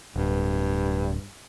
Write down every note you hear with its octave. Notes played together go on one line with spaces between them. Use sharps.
D1 G2